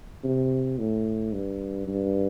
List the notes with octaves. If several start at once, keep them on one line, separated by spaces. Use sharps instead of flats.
C3
A2
G2
G2